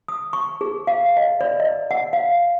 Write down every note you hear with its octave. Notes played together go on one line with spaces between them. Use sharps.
D#6
C#6
G#4
F5
D#5
D5
D#5
F#5
F5